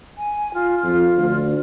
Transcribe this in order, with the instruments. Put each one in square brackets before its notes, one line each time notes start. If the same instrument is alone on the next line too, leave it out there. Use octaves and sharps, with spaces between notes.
[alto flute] G#5
F4
[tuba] F2 [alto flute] F4
[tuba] D2